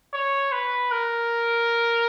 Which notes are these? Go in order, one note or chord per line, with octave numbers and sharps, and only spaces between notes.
C#5
B4
A#4